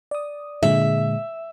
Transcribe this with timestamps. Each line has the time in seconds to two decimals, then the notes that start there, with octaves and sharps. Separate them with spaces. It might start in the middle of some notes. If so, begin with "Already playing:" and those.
0.11 D5 D#6
0.63 A#2 D3 G#3 E5